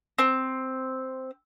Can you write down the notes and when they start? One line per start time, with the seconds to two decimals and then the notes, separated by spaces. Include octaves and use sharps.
0.19 C4